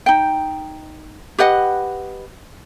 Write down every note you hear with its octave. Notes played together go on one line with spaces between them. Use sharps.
D#4 G5
G4 B4 D#5 F#5